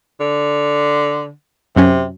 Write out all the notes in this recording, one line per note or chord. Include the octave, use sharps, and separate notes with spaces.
D3
F#2 C3 F#3 C#4